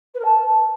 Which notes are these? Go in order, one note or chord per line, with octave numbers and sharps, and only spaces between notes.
B4
A#4
A5